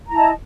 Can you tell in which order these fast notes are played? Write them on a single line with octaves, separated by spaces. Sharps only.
A#5 E4 A5 D#5